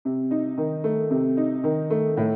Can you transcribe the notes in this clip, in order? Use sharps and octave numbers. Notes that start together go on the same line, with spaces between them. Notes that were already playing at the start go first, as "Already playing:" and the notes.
C3
D#4
D#3
A3
C3
D#4
D#3
A3
A2